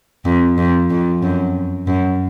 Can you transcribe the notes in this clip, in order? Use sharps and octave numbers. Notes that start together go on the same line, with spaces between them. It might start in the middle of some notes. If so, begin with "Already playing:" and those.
F2
F2
F2
F#2
F#2